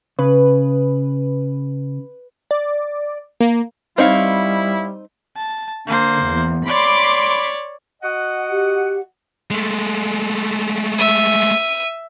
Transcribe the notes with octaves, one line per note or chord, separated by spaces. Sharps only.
C#3 B4
D5
A#3
G3 C4 D#4 E4 C5 C#5 F5
A5
D3 A#3 C5
E2
C#5 D5 B5 C6 D6
F#4 D#5 F#5
G4
G#3 A3
E5 D#7